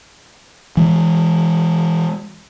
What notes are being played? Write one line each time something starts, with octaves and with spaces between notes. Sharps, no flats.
E3 G#3